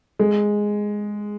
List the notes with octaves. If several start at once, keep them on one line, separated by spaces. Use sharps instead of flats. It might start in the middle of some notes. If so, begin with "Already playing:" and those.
G#3